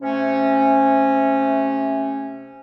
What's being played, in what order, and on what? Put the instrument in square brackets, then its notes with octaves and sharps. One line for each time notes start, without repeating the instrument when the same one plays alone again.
[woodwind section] C3 A3 C#4